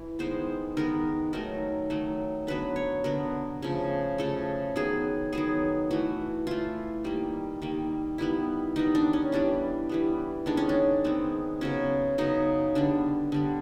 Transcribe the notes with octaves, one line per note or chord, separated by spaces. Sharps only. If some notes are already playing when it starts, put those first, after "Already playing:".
Already playing: E3
D#3 G#3 B3 C5
D#3 G#3 B3 A#4
D#3 F#3 A3 A#4
D#3 F#3 A3
D3 F#3 B3 B4
C#5
D3 F#3 B3 A#4
C#3 F3 A3
C#3 F3 A3 A4
D#3 F#3 B3 G#4
D#3 F#3 B3 G#4
E3 A3 F#4
E3 A3 F4
D#3 G3 A#3
D#3 G3 A#3
D#3 G3 B3 E4
D#3 G3 B3 D#4
D4
C#4
E3 G3 B3 D4
E3 G3 B3
D#3 G#3 B3 D4
C#4
D4
D#3 G#3 B3 C4
C#3 F#3 B3 C#4
C#3 F#3 B3 D#4
D3 G3 B3 D4
D3 G3 B3